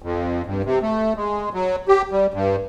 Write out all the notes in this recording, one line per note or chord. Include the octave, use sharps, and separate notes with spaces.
F2
G2
C3
A3
G#3
F#3
G4
G3
G2